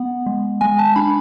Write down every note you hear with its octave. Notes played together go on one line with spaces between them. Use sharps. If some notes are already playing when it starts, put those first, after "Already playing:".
Already playing: B3 F#5
G#3
G#3 G#5
A5
D4 B5